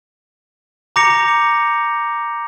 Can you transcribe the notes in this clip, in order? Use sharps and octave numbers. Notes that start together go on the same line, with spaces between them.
A#5 D6 G6 A#6 C#7 F7